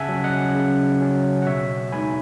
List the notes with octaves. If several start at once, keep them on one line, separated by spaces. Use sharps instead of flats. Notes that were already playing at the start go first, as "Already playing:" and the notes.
Already playing: C#3 E5 F#5 G#5 A5
F#3 C#4
D#5 F#5
C#3
F#3 C#4
F#5
B2 C#5 E5
G#3 B3 D#4 G#5 B5